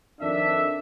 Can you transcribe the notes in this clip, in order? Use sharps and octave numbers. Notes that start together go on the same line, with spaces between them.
F2 D#3 D4 E5